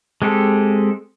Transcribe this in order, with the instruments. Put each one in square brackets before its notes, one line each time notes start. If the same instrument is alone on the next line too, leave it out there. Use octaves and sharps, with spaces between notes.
[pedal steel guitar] G#3 C4 G4 A4